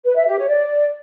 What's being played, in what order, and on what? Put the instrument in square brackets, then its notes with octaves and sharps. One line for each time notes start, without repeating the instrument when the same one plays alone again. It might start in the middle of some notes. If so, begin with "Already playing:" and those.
[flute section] B4
E5
G4
C#5
D5